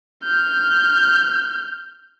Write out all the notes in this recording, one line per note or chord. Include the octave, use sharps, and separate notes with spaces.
F6 G6